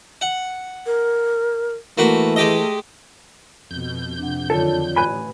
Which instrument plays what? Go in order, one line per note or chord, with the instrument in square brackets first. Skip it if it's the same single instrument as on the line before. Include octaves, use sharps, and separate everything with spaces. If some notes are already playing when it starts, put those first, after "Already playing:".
[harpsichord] F#5
[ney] A#4
[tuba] E3 [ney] A3 [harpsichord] A#3 F#4 B4
[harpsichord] G#3 G4 D#5
[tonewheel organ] F2 G6 [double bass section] B2
[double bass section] C3 [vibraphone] D4 F#5
[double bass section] F#2 D3 D#3 [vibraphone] F4 C#5 D5 [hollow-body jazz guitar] A4
[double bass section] A1 [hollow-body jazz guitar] B4 G#5 B5